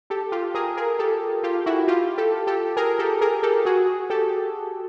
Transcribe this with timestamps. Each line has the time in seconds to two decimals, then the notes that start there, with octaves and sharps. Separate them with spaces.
0.10 G4 A4
0.32 F4 G4
0.55 G#4 A#4
0.77 G#4 A#4
0.99 G4 A4
1.43 F4 G4
1.66 E4 F#4
1.88 F4 G4
2.18 G4 A4
2.47 G4 A4
2.76 G#4 A#4
2.99 G4 A4
3.21 G#4 A#4
3.43 G4 A4
3.65 F#4 G#4
4.10 G4 A4